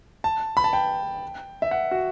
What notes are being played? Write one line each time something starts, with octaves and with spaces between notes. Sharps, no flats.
A5
B5
A5
G5
E5
F#5
F#4